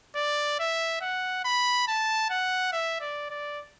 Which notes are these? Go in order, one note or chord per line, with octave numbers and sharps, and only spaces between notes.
D5
E5
F#5
B5
A5
F#5
E5
D5
D5